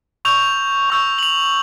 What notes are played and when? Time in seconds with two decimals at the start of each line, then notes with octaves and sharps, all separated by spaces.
0.25 C#6 E6 G6 F7
0.90 C#6 E6 G6
1.18 F#7
1.23 F7